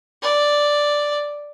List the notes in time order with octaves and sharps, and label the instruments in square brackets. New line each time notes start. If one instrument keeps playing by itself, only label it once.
[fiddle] D5